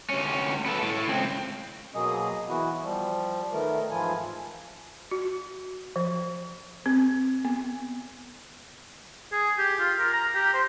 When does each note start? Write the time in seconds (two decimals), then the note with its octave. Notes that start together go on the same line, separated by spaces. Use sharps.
0.09 D2 C#4
0.66 B3 A4
0.82 A2
1.08 C#2 C4
1.95 B2 F#3 A#3 G#4 D#5
2.49 E3 B3 E4 F#4
2.83 F3 G3
3.52 D#3 A3 B3 A#4
3.91 G#2 E3 F3 E4 F4 G#5
5.11 F#4
5.96 F3
6.86 C4
7.45 B3
9.32 G#4
9.58 G4
9.79 F4
9.99 A#4
10.13 A#5
10.34 G4
10.53 C5